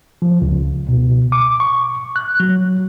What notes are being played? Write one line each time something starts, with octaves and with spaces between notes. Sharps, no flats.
F3
C#2
B2
D6
C#6
F#6
F#3